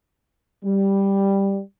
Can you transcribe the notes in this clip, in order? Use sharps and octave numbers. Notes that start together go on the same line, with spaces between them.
G3